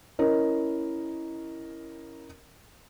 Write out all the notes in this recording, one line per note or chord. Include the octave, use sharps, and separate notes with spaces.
C#4 E4 A#4 D#5